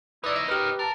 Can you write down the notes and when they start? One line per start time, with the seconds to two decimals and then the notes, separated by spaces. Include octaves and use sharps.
0.24 C#4 D#4 E4 B4 D5
0.36 D#5
0.48 G4 A#4 B4
0.79 A#4 A5